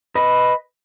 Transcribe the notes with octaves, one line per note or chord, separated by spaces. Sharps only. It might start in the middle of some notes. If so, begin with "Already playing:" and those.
B4 D#5